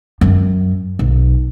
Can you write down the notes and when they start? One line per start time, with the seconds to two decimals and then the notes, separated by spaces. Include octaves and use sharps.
0.21 F#2
0.99 B1